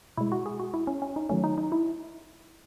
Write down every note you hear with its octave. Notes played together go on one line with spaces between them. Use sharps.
B2 G#3 E4
F#4
G#4
F#4
E4
C#4
C#4
D#4
D#3 F#3 A3 C#4
D#4
D#4
E4